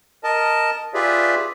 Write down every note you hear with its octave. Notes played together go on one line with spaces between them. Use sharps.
A#4 D#5 A5
F4 G4 G#4 B4 D5 E5